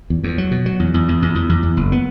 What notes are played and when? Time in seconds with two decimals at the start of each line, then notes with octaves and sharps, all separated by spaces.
0.10 E2
0.24 E2
0.38 F#3
0.51 B2
0.66 F#3
0.80 E2
0.94 E2
1.08 E2
1.22 E2
1.35 E2
1.49 E2
1.63 E2
1.77 F#1
1.92 B3